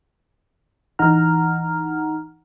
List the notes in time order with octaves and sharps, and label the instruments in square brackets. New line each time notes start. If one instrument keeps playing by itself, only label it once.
[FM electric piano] A1 E3 D#4 F#5 A#5 F6